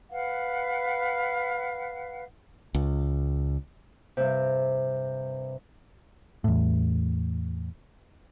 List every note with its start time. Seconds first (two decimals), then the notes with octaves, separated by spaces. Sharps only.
0.10 B4 F5 F#5
2.74 C#2
4.17 G2 C3
6.44 E2 A2